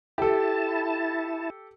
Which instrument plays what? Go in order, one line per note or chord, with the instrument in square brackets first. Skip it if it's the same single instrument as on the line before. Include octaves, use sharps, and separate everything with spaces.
[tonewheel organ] E4 A5 [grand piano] G4 A4